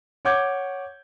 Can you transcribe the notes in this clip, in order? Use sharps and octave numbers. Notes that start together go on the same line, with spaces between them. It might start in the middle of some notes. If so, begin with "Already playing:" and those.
C#5 F#5 D6 G6 G#6